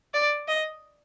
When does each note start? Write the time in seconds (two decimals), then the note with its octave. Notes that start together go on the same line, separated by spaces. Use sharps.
0.14 D5
0.48 D#5